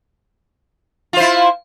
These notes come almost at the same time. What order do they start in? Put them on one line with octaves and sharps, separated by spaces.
F4 C5 E4